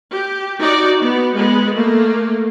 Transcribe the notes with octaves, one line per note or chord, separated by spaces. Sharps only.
G4
D#4 F#4 D5
B3
G#3 B3
A3 A#3